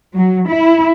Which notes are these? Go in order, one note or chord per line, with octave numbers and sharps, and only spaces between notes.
F#3
E4